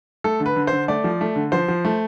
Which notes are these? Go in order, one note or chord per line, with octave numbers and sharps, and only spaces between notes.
A3 A4
D3
B4
D3
D3 C5
A3 D5
F3
A3
D3
F3 C5
F3
A3